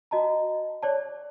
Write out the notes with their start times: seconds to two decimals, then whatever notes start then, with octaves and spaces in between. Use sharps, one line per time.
0.11 F#4 D#5 A5 A#5
0.83 C#5 D5 A5